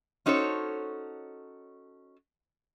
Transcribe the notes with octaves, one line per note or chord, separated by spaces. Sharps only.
C#4 D#4 F#4 A4 C5 C#5